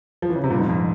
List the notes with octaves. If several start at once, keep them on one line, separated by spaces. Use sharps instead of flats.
F3
E3
C#3
C3
G2 A#2
F2 G#2
F2